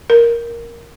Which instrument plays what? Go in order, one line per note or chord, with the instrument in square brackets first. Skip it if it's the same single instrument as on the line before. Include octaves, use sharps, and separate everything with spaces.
[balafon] A#4